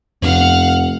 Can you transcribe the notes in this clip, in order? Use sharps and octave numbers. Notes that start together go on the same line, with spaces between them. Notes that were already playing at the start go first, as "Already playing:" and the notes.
F1 F2 B3 F5 F#5